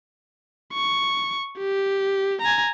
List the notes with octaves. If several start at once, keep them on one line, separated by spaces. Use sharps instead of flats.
C#6
G4
G#5 A#5